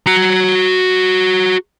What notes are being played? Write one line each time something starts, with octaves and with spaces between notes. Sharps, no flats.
F#4 A#5